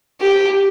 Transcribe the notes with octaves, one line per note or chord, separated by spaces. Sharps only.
G4